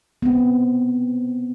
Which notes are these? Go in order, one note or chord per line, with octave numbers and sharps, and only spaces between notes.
B3 C4